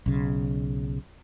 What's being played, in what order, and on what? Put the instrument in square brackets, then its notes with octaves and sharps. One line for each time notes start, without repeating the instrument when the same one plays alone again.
[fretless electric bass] B1 C#3